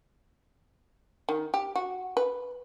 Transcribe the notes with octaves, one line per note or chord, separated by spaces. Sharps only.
D#3
G4
F#4
B4